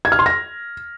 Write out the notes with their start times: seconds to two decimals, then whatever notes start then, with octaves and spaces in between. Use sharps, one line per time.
0.05 G#6
0.12 F6
0.19 C6
0.26 A#6